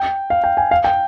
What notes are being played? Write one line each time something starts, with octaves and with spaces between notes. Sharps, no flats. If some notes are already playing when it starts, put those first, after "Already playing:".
Already playing: G5
F5
G5
G#5
F5
G5